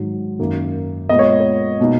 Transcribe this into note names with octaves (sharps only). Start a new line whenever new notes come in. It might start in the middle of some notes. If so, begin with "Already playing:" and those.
Already playing: G#2 D#3 F#3
F#2 D#3 A#3
A#2 G#3 B3 D#5
C#5
C#5
B2 A#3 D#4